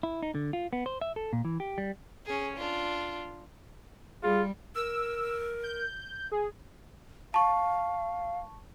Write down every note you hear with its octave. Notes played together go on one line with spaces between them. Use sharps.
E4
D#4
D3
F4
B3
C5
E5
A4
A#2
E3
G4
G3
C#4 G#4
D4 F4
G3 F4 G#4
A#4 E6
G6
G#4
F5 A5 C#6